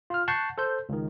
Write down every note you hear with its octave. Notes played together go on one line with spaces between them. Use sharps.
F4 F6
F#5 A5 C#6 F#6 G6 C7
A4 C5 G6
C#2 D#3